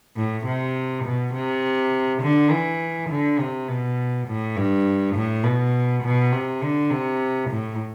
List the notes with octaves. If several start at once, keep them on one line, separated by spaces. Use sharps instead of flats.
A2
C3
B2
C3
D3
E3
D3
C3
B2
A2
G2
A2
B2
B2
C3
D3
C3
A2